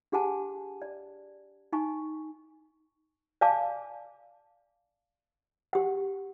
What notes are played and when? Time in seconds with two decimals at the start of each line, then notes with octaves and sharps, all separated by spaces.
0.12 D4 G4 G#4 F#5 G#5 A5
0.82 D5
1.73 D#4 G#5 C#6
3.41 D5 F5 G#5 A5 D6
5.73 G4 F#5